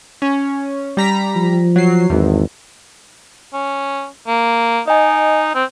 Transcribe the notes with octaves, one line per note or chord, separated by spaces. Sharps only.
C#4
G3 A#5 B6
F3
F#3 C7
G#1 E2
C#4
A#3
D#4 D#5 G#5
C4